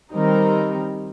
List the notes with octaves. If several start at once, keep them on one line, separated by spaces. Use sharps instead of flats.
D#3 G3 C4 D#4 A#4